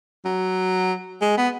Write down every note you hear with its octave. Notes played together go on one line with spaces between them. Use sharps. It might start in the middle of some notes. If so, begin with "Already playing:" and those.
F#3
G#3
B3